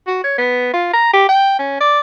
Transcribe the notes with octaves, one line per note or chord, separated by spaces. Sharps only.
F#4
C#5
B3
F4
A#5
G4
G5
C#4
D5